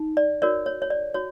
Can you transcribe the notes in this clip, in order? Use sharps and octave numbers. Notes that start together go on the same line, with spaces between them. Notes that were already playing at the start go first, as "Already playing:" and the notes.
Already playing: D#4
D5
F#4 A#4 C#5 D5
C#5
C#5
D5
F#4 C#5